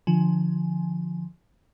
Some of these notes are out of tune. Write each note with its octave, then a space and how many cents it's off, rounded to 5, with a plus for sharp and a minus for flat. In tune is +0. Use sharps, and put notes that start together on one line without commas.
D3 +25 F3 +0 G#5 +15